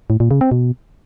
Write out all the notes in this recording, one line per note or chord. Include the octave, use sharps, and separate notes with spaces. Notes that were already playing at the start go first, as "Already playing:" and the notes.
A2
A#2
C#3
C4
B2